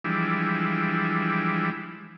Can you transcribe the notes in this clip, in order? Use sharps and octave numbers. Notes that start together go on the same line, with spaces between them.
E3 F3 G3 G#3 D4 E4